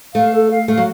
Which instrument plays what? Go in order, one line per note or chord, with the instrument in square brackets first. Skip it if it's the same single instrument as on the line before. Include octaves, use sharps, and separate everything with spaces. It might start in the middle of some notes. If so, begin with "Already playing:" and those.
[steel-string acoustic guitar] A3 [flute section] F5
[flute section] A4
F5
[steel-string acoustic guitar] A3 [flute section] F5
[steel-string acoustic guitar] F#3